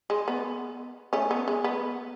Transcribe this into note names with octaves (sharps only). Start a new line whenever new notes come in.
G#3
B3
A3 C#4
B3
G#3
B3